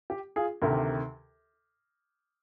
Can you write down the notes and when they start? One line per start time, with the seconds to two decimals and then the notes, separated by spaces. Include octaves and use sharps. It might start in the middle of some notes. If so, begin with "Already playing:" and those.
0.10 G4
0.36 F4 G#4
0.62 D2 C3 D#3 G4 A#4